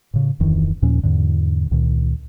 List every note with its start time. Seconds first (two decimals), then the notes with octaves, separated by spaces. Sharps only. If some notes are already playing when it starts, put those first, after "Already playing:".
0.14 A2 C#3
0.40 D1 F2 D#3 E3
0.82 D#2 A#2 F3 C#4
1.03 E2 G#2 D3
1.71 C#2 A#2 D#3